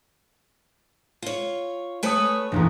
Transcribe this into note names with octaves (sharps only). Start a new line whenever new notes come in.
F4 C#5
A3 B4 C#5 G#5 D#6
F1 A#1 E2